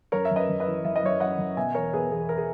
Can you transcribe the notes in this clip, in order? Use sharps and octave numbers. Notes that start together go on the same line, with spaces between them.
F#2 A#4 C#5
E5
F#2
B4 D#5
F#2
B4 D#5
E3
F#2 E5
D#5
F#2 C#5 E5
F#2 D#5 F#5
F#2
B2 E5 G#5
E2 A#4 C#5
B2 G#4 B4
E2 G#4
A#4
G#4